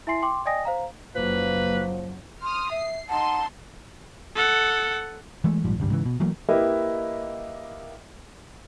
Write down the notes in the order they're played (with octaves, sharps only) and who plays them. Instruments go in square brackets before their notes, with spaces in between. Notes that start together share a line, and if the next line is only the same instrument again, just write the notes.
[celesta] E4 E5 G#5 C6 C7
G5 C6 D6
D5 D#5 G5 G#5 D#6 A#6
C5 F5 A#5
[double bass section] F#1 F#3 [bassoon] F3 [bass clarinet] A#3 [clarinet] B4
[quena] C6 [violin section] D#6 F6
[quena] E5 [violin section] C7
[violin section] D#4 C6 [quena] F#5 [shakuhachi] A5
[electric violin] A4 F#5
[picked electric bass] E3 G#3 A3
A#1 G#2 F3 G3
G#1 C#2 G2 G3
G#2 C#3 E3
B2
E3 F#3 A3 A#3
[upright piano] A#3 E4 G4 B4 D#5